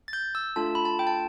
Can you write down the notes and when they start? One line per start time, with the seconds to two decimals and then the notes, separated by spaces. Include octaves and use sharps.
0.08 A6
0.13 G6
0.35 E6
0.56 A3 D4 F4 A4 A5
0.75 B5
0.85 A5
0.99 G5
1.07 A5